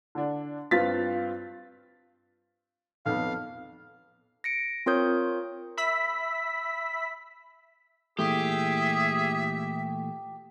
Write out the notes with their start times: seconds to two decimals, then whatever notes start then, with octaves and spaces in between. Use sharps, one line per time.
0.15 D3 D4
0.71 G2 C4 F4 F5 A6 B6
3.06 B1 F2 B3 F5
4.44 A#6 C#7 D7
4.86 C4 F4 A#4 C#5 D#6 G6
5.77 E5 B5 E6 B6
8.19 A#2 E3 A3 G4 G#4 E5